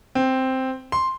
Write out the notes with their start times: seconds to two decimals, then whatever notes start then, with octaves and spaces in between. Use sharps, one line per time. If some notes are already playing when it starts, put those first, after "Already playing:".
0.15 C4
0.92 C6